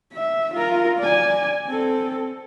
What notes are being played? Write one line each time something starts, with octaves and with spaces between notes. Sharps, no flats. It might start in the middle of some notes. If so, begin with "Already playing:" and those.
E5
F4 A#4
D5 G#5
C4 A4